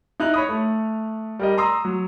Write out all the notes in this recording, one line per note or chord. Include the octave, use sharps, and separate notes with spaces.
D#4 E4 F#6 F7
C#5 B5 D#6
A3
G3 A#4 D#5
A#5 C6 D#6 E6
F#3